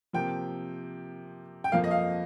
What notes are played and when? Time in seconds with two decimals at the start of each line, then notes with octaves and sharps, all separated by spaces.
0.13 C3 F3 A#3 G5
1.64 G5
1.72 F2 F3 A#3 F5
1.84 D#5
1.91 F5